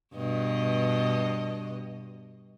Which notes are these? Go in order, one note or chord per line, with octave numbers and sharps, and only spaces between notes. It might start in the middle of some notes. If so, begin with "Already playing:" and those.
G2 B2 D#5